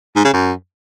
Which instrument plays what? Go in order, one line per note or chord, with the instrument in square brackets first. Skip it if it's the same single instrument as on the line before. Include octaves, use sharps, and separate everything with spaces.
[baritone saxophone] G#2
C#3
F#2